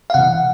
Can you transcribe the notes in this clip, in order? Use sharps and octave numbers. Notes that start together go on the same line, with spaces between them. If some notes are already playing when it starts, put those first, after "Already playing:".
F5
C3 E3 F#5